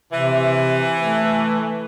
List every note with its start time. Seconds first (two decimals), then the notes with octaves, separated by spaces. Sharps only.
0.13 C3 E3
1.01 A3